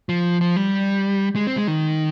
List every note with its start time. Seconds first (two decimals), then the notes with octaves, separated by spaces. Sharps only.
0.09 F3
0.41 F3
0.56 G3
1.36 G#3
1.47 C4
1.57 G#3
1.68 D#3